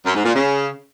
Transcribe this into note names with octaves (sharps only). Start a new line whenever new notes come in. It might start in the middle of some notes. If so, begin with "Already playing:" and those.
F#2
G#2
A#2
C#3